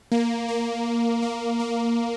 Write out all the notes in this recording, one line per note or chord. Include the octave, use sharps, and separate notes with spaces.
A#3
A#3
A#3
A#3